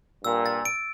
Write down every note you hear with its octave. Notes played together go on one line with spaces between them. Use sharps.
G2 A#2 E6
A6
D7